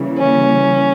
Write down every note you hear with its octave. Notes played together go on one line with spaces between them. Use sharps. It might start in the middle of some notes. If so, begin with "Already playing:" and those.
Already playing: C#3 E3 G3 A#3
C#4